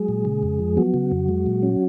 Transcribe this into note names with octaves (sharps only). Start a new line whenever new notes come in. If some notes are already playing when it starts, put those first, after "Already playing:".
Already playing: F#3 G#3 G#4
A#2
C#3
F2
F3
F#3 B3 F#4
C#3
F2
G#3
A#2
C#4